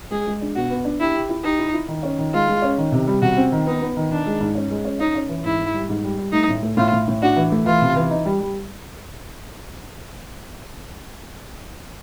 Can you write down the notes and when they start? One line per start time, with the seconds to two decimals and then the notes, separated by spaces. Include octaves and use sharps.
0.11 G#3 G#4
0.26 G#3
0.41 D4
0.56 B2 F#4
0.70 B3
0.85 D4
1.00 E4 G4
1.14 G4
1.29 E4
1.44 D#4 G4
1.59 E4
1.74 E4
1.88 D#3
2.03 C#4
2.18 D#3
2.34 G#3 F4
2.48 G#3
2.62 C#4
2.78 D#3
2.92 C3
3.07 G3
3.22 C3 F#4
3.37 C4
3.52 D#3
3.66 B3 D#4
3.81 B3
3.97 D#3
4.10 D#3 D4
4.26 G#3
4.40 G#2
4.55 C#4
4.70 G#3
4.85 C#4
4.99 C#4 D#4
5.15 C#4
5.29 E3
5.44 G#2 E4
5.58 G#2
5.74 G3
5.89 G#2
6.03 G3
6.18 G3
6.33 A3 D#4
6.48 A2
6.62 A3
6.77 A2 F4
6.92 A2
7.08 A2
7.22 D4 F#4
7.36 E3
7.52 A3
7.66 E3 F4
7.82 C3
7.96 E3
8.10 D#4
8.25 G3
8.40 G3